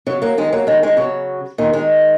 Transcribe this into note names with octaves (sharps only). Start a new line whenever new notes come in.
C#3 F#3
F#3 A#3
D#3 G#3
F#3 A#3
D#3 G#3
D#3 G#3
C#3 F#3
A#2 D#3
D#3 G#3